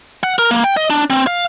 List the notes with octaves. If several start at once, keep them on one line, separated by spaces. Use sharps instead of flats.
F#5
A#4
A#3
G5
D#5
D4
C4
F5